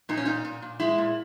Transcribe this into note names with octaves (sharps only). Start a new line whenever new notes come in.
A#2 D#4
C#4
A#2 D#4
A#2
A#2
G#3 E4
A#2